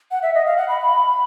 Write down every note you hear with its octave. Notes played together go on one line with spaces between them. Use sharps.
F#5
E5
D#5
F5
F#5
B5
B5